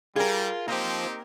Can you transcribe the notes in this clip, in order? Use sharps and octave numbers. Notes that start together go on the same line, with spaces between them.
G3 F4 G#4 A#4
A#3 C4 D#4 F4 G4 C5